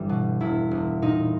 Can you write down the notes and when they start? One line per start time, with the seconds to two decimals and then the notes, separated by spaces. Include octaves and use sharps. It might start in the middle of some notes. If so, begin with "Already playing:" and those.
Already playing: G1 G2 E3 G3
0.09 B2
0.40 E1 E4
0.71 E1
1.02 A#2 D#4